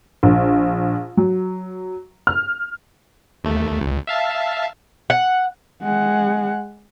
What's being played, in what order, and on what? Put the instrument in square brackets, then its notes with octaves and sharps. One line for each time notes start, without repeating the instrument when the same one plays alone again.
[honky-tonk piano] A#1
F#3
F6
[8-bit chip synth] D#2 A3
C#2
E5 F5 A5
[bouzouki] F#5
[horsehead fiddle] G#3 F#5